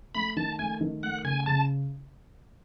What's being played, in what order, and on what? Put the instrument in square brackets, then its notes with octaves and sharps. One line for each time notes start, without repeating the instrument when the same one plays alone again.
[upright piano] A3 [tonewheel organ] B5
[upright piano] D#3 [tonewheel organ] A5
[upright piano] A3 [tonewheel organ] G#5
[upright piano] D#3
[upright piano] A3 [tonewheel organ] F#5
[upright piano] C#3 [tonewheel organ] G#5
[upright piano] C#3 [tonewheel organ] A5